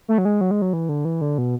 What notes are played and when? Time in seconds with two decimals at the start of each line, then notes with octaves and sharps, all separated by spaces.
0.08 A3
0.18 F#3
0.25 G#3
0.41 F#3
0.51 G#3
0.62 F#3
0.73 E3
0.89 D3
1.05 E3
1.21 D3
1.38 B2